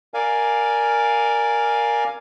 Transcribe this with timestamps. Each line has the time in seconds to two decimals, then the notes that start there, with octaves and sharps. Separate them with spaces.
0.14 A#4 D5 F5 G#5